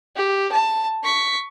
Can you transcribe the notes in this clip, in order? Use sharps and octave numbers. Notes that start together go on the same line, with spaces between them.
G4
A5
C#6 B6